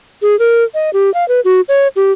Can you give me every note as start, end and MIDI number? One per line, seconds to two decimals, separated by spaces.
0.22 0.38 68
0.39 0.64 70
0.74 0.90 75
0.93 1.12 67
1.14 1.27 77
1.28 1.40 71
1.45 1.61 66
1.68 1.88 73
1.96 2.12 67